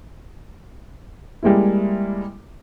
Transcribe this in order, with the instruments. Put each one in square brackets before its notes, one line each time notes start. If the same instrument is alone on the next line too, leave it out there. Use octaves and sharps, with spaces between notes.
[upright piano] G3 G#3 A#3 E4